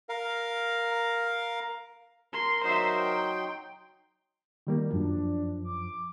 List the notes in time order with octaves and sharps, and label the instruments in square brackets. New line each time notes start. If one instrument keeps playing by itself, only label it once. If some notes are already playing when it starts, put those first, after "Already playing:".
[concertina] A#4 F5
[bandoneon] A#4 [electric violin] C6
[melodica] F#3 D#4 C6 [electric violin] C5 E5
[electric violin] G5
[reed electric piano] D#3 G3 A#3
[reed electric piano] F#2 F3 [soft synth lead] D4
[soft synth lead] D6